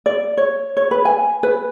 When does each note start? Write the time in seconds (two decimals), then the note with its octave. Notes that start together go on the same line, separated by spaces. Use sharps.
0.06 D5
0.37 C#5
0.77 C#5
0.91 B4
1.05 G#5
1.43 B4